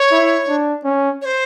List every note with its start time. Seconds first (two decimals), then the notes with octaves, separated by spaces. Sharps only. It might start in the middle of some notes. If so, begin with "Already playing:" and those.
Already playing: C#5
0.11 E4
0.49 D4
0.85 C#4
1.21 C#5
1.25 C5